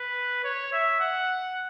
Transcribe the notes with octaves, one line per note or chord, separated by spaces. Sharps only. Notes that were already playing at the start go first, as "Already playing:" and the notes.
Already playing: B4
C#5
E5
F#5